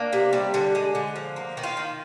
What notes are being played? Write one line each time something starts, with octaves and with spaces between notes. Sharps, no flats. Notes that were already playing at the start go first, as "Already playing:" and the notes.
Already playing: A#3 D4
C3
G3
D3
G#3
D3
F3
A#3
D#3
F4
D#3